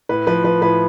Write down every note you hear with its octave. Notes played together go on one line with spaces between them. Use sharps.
A2 B4
F3 B4
F3 B4
A2 B4